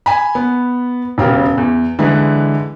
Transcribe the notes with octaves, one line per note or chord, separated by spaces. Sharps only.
G#5 B5
B3
E1 C#3 G4 A#4
E2
D3 E3 G#3 B4